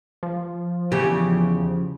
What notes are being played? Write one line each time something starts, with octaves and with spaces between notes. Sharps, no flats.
F3
E2 C#3 G4